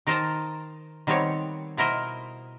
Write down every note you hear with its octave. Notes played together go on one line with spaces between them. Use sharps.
D#3 A#4 C5 D#5 A5 A#5
D#3 G3 B3 C4 C#5
B2 E4 A#4 C5 D#5